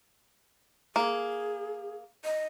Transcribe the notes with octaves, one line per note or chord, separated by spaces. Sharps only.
A#3 G#4
D#5